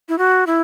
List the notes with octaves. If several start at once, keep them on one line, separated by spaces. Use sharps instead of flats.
E4
F#4
E4